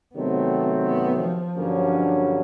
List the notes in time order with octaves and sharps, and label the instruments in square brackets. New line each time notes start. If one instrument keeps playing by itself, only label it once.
[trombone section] C3 D#3 F#3 A3 C4 [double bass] B3
[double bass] B3
F3
[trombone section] G2 D3 F#3 A#3 C#4